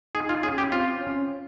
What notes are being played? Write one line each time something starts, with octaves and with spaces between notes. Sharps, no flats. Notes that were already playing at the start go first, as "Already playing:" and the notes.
D#4 G#4
F4
C#4 G#4
G4
C4 F4
C#4